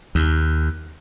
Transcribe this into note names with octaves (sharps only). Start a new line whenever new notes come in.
D#2